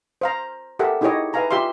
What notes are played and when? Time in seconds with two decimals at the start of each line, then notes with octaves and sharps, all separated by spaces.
0.21 C5 F5 A#5
0.79 G4 A4 A#4 E5 F#5
1.01 D#4 E4 G4 G#4 C#5 D#5
1.33 B4 E5 F5 G#5 A#5 C#6
1.51 F4 G4 E5 F5 C6